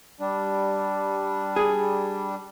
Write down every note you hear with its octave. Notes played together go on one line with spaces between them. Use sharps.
G3 D4
G#4